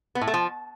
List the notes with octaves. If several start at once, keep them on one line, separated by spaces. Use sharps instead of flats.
B3
A2
A3
F3